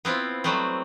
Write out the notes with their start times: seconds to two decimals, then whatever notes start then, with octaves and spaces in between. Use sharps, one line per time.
0.05 B3 C4 E4 F4
0.44 F#3 G3 A3 B3 C4